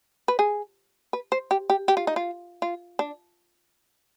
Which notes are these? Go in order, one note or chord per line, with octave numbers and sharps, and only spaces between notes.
B4
G#4
B4
C5
G4
G4
G4
F4
D#4
F4
F4
D4